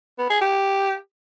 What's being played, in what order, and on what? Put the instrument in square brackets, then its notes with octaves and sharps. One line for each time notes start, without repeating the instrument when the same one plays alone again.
[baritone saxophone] B3
G#4
G4